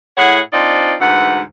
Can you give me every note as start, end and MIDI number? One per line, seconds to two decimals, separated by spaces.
0.17 0.40 45
0.17 0.40 64
0.17 0.40 68
0.17 0.40 73
0.17 0.40 78
0.53 0.95 60
0.53 0.95 62
0.53 0.95 63
0.53 0.95 65
0.53 0.95 72
0.53 0.95 74
1.00 1.40 38
1.00 1.40 44
1.00 1.40 52
1.00 1.40 78